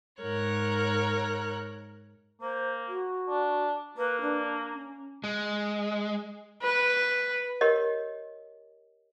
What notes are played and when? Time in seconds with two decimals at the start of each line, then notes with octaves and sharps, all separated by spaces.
0.21 G#2 A#4 C#5 F#6
2.42 A#3 C5
2.88 F#4
3.29 D4
3.98 A#3 B4
4.21 D4
4.73 C#4
5.24 G#3
6.62 B4
7.61 G4 A#4 C#5 D#5